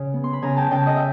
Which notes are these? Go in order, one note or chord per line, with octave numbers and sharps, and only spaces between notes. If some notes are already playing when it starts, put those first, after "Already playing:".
Already playing: C#3
B3
C6
B5
C#3 G#5 A#5
G5 A5
C#3 G5 A5
D#5
E5